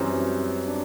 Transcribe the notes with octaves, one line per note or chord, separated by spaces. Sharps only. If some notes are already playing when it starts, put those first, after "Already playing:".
Already playing: F#2 E3 G3 C4
D4